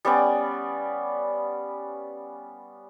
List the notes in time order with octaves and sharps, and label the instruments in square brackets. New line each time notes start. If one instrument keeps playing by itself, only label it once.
[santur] G3 B3 C#4 D5